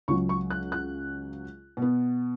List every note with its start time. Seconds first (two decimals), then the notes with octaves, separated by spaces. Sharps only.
0.08 C#2 C#3 F#3 C#6
0.29 C#6
0.50 F#6
0.72 F#6
1.77 B2 B3